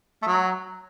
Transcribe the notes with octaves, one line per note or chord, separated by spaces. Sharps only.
A3
F#3